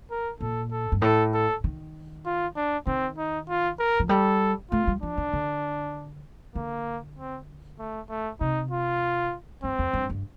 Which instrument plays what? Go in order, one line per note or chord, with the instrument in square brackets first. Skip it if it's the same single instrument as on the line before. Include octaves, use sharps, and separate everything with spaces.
[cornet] A#4
[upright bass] A#2 [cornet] A4
[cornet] A4
[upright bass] G2
[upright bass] A2 [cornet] A4
[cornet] A4
[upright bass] D#3
[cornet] F4
D4
[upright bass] D#3 [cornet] C4
[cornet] D#4
F4
A#4
[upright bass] F3
[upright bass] G3 [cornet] A4
[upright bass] A3 [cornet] F4
[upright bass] G3
[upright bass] F3 [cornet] D4
[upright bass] D#3
D3
[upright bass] D3 [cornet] A#3
[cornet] C4
A3
A3
[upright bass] C3 [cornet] D#4
[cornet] F4
[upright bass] G2 [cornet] C4
[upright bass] F2
G2
G2